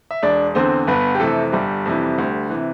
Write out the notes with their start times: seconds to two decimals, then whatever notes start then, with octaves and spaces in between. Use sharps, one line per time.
0.11 E5
0.22 E1 D4 D5
0.55 E2 D3 C4 C5
0.87 G1 B3 B4
1.15 G4
1.20 F2 C3 E3 A3 A4
1.52 G1 G3 G4
1.86 F2 C3 E3
2.18 D2
2.50 C3 E3